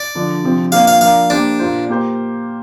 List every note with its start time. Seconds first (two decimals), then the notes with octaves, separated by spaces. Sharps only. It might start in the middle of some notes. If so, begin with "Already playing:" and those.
Already playing: D5
0.15 D3 F3 D4
0.43 C3 F3 C4
0.72 A#3 D4 F4 C5 F5
0.87 F5
1.01 F3 D4 A#4 F5
1.30 A#3 D4 G4 C5
1.59 A#2 A#3 F4 C5
1.89 A#3 G4 C5